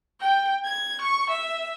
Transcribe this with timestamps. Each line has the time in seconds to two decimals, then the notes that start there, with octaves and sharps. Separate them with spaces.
0.19 G5
0.64 G#6
0.99 C#6
1.29 E5